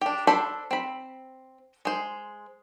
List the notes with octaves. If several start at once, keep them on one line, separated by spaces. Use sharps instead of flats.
D4 G4
D4 A4 C5 B5
C4 B5
G#3 C5